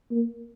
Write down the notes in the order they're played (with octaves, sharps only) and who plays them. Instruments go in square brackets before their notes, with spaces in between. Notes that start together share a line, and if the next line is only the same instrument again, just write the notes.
[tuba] A#3